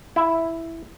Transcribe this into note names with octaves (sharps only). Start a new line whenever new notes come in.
E4